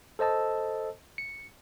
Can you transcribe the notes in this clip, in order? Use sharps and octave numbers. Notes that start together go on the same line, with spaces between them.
A4 C5 D#5 A5 E6
C#7